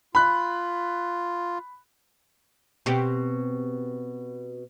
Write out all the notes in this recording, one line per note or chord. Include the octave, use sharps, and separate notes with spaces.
F4 B5 F#6
B2 C4 G4